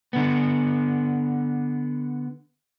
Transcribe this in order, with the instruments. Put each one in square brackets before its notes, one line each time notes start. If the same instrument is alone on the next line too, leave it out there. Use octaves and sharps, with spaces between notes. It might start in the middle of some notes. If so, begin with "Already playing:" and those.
[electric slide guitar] D3 B3